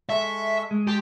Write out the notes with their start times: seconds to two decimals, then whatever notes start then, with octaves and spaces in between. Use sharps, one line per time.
0.09 G#3 A4 E5 C#6
0.71 G#3
0.87 G4 A5 C6